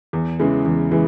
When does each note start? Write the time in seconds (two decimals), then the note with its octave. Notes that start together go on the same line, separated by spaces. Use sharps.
0.13 E2
0.39 C#3 E3 G#3
0.66 E2
0.92 E3 G#3